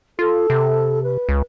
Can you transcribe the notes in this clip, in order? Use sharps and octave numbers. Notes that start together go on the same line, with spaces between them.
F4 A4
C3
B4
C#2